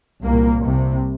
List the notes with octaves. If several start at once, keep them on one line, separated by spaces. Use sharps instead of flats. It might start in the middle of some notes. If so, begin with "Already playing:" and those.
C2 A#2 A#3
C2 C3